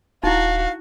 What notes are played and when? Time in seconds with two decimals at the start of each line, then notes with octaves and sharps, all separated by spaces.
0.23 D#1 D#4 E4 F#4 F5